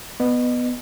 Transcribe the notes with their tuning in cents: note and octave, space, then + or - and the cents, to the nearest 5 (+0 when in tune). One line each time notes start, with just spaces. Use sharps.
B3 +0 D#5 -30